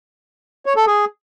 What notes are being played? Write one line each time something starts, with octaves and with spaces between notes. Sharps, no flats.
C#5
A4
G#4